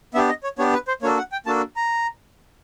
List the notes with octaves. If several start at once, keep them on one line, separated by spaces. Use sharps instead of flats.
B3 D4 G4 E5
D#5
C#5
B3 D4 G4 C#5
B4
C5
A#3 D4 F#4 A4 C#5
F#5
G5
A#3 D4 F#4 A4 A5
A#5